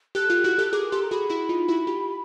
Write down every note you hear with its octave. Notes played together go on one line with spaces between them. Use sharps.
G4 A4 F#6
F4 G4
E4 F#4
G4 A4
G#4 A#4 D6
G4 A4 C6
A#5
F#4 G#4 B5
E4 F#4
D#4 F4
E4 F#4
F4 G4